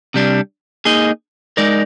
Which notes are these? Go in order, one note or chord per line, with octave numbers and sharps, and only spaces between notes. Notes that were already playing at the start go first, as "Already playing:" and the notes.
C3 G3 D4
A#3 D#4 G#4 D#5
G#3 D#4 A#4 D5